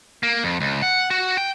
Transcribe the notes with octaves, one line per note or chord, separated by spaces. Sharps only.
A#3
F2
C#2
F#5
F#4
G5